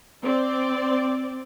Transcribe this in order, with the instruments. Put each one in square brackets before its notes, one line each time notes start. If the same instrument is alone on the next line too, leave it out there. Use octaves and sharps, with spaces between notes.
[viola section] C4 D5